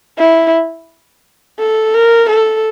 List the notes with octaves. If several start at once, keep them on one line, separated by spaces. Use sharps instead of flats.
E4
A4
A#4
A4